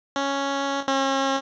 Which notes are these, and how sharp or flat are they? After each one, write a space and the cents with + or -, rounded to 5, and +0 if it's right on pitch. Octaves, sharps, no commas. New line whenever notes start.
C#4 +0
C#4 -40